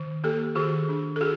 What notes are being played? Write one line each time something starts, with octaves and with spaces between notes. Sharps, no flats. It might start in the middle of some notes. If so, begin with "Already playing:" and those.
Already playing: D#3
A#3 G4 A4
D#3 F#4 G#4
D4
A4
F#4 G#4